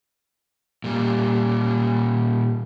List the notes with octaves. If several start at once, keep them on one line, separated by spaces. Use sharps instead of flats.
A#2 G3